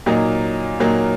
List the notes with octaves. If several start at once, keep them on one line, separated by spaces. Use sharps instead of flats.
A#2 F#3 A#3 D#4
A#2 F#3 A#3 D#4